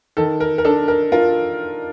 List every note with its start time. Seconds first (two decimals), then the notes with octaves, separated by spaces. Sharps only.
0.17 D#3 A4
0.40 A#4
0.58 A#4
0.65 D4 A4
0.88 A#4
1.12 F4 A#4